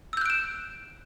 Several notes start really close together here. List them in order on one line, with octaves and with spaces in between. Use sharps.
E6 G6 F#6 D7 E7